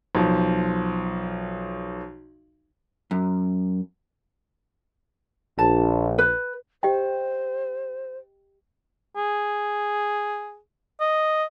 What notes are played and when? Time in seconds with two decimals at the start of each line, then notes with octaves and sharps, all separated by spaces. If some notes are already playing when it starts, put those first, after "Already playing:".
0.15 B1 F3
3.11 F#2
5.59 A#1 A5
6.18 B4
6.83 G4 C5 D#5 G5
9.16 G#4
11.00 D#5